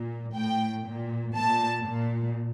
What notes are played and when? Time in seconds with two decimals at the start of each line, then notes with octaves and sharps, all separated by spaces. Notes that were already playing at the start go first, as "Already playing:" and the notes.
Already playing: A#2
0.35 A2 G5
0.85 A#2
1.36 A#2 A5
1.87 A#2